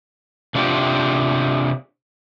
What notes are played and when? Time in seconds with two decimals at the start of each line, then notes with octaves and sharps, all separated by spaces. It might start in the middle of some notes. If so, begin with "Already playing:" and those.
0.55 C3 D4 F4 G4